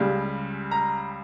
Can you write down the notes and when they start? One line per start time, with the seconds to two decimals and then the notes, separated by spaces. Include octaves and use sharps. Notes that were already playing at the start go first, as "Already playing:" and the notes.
Already playing: C#2 C#3 G3
0.71 A#5